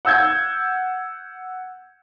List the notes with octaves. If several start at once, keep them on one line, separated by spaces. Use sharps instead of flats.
F#5 E6 G6 G#6